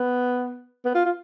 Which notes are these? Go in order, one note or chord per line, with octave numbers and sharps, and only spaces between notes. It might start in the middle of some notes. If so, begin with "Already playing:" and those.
Already playing: B3
B3
F4
F4